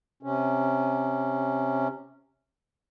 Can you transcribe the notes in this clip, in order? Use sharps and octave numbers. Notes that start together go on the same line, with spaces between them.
C3 C#4